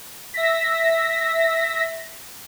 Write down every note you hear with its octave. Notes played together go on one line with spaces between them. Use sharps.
E5 A#6 B6